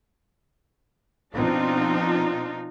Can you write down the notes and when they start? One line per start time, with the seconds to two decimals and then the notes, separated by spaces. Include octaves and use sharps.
1.35 B2 F3 C4 D4 D#4 F4